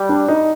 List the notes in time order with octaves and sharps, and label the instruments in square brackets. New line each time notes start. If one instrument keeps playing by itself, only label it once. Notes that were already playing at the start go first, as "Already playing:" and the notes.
Already playing: [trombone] G3
[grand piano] D4
D#4